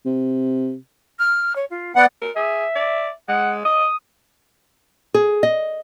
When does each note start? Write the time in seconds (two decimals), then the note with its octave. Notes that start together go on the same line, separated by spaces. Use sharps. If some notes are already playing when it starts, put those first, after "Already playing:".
0.05 C3
1.19 F6
1.55 C#5
1.70 F4
1.96 B3 D5 F#5
2.22 A#4
2.36 G#4 E5
2.75 D5
3.28 G#3 F#5
3.65 D#5 D#6
5.14 G#4
5.43 D#5